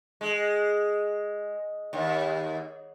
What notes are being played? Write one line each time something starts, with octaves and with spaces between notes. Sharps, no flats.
G#3
D#2